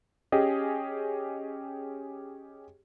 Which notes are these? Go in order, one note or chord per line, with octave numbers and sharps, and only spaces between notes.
C#4 G4 G#4 D#5